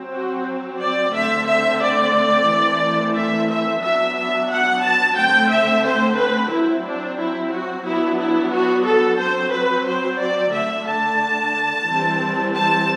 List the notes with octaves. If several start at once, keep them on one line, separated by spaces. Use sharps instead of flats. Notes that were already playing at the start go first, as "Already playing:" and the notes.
Already playing: F#3 C4
F#4
D5
D3 A3 C4 E5
E5
D5
E3 A3 C4
E5
E5
F#3 B3 D4 E5
E5
F#5
A5
D3 A3 C4 G5
E5
C5
B4
F#3 C4 E4
D4
E4
F#4
F#3 B3 D4 E4
E4
F#4
A4
F#3 C4 C5
B4
C5
D5
D3 A3 D4 E5
A5
E3 G3 C4
A5